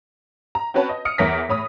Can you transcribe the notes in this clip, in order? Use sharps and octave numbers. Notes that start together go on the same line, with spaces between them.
A#5
C4 C#4 F#4 B4 C#5 A5
D#5
D#6 F6 C#7
E2 E3 A#4 C#5 A#6 B6
A2 C#5 B5 D#6